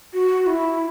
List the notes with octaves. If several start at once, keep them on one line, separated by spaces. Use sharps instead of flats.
F#4
E4